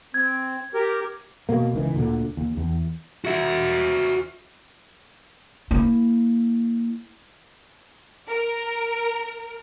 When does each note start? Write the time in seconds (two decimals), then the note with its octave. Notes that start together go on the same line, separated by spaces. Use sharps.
0.14 C4 G#6
0.74 G4 A#4
1.49 B2 A#3
1.73 C#2 D#3 E3
1.94 D2 A#2 D3
2.37 D#2
2.57 E2
3.25 F#4 E5
5.71 A#3 E4
8.27 A#4